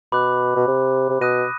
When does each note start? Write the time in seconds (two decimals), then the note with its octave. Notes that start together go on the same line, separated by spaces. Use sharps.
0.12 B2 B5 D6 F#6
0.56 B2
0.67 C3
1.09 C3
1.20 B2 D#6 F#6 A#6 D#7